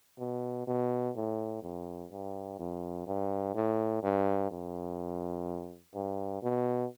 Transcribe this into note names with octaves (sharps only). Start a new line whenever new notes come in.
B2
B2
A2
F2
G2
F2
G2
A2
G2
F2
G2
B2